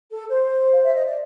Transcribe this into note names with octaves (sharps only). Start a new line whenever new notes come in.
A4
C5
F5
E5
D#5
D5